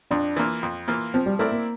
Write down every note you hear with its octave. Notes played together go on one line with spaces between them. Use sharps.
F2 D4
E3 A#3 F4
F2
E3 A#3 F4
F3 C4
G3
A3 C4 E4 A#4 D5
A#3